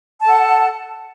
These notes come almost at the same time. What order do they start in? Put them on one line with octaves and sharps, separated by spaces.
A5 A4 F#5